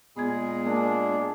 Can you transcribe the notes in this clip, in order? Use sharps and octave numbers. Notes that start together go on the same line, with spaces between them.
A#2 G#3 B3 G#4 G#6
A#3 D4